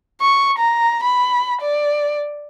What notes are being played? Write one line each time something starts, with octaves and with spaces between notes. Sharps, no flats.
C#6
A#5
B5
D5